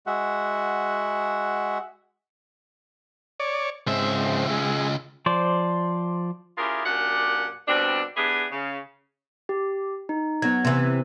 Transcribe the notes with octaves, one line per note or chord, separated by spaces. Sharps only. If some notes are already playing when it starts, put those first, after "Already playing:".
G#3 F#4 E5 F#5
C#5 D5
C#2 G#2 C4 E5
G#3
F3 C5 D5
C#4 E4 F4 G4 G#4 A#4
F#2 A#2 D4 G4 F#5
B2 G3 C4 D4
B3 D4 E4 G4 G#4
C#3
G4
D#4
F#3 B3 G#6
C3 E3